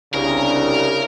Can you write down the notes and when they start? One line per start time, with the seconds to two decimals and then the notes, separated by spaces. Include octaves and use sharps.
0.13 C2 C#3 D4 A#4